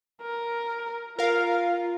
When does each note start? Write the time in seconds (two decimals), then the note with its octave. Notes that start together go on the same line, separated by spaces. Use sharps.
0.22 A#4
1.19 F4 A#4 F5